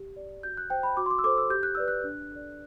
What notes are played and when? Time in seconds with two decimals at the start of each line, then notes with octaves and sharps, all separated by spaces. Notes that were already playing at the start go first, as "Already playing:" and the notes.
Already playing: G4
0.16 D5
0.43 F#4 G6
0.57 F#6
0.70 C5 G5
0.83 B5
0.97 F#4 D6
1.06 C6
1.11 D6
1.19 E6
1.24 A4 C5 D6
1.38 E6
1.50 G4 G6
1.63 F#6
1.75 B4 D5 E6
1.88 F#6
2.04 D4
2.31 A4 D5